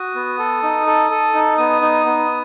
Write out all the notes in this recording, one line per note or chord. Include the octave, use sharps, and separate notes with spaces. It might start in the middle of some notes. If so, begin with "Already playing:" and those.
Already playing: F#4 D#6
B3
A4
D#4
A4
A4
D#4
B3 D#6
D#4
B3